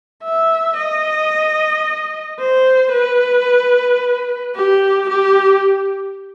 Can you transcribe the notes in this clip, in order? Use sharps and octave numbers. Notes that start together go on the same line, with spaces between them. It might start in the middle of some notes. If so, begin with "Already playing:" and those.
E5
D#5
C5
B4
G4
G4